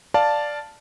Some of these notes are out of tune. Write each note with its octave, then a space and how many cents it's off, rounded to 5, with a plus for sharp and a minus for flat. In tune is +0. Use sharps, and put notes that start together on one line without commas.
D5 +0 F5 +0 A5 +0